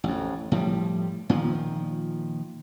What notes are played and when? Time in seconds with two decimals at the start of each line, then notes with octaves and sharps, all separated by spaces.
0.04 A1 F2
0.52 A2 F3 G3
1.30 A#2 D#3 F3